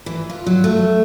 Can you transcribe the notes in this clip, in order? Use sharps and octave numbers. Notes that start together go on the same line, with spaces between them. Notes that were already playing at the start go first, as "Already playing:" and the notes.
E3
F4
F#3
A3